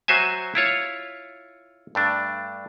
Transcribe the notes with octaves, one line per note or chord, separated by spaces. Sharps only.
F#3 F#4 C5 E5 G#5
E4 F4 C#5
G2 A3 D4